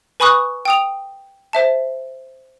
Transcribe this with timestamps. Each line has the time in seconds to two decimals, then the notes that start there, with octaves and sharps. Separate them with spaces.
0.20 B4 G#5 B5 C#6 D#6 F#6
0.65 G5 D#6 F7
1.53 C5 E5 A5